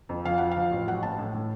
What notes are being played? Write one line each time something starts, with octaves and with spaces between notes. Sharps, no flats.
F2
F3 F5
F3 F#5
F5
F3
A1
F#3 F#5
A1 A5
A2
A2